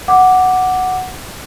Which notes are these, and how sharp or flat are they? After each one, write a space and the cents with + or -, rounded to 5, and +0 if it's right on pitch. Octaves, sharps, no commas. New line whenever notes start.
F#5 +0 D6 +0